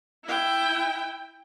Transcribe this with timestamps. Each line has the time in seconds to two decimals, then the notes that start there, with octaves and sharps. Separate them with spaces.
0.25 E4 G5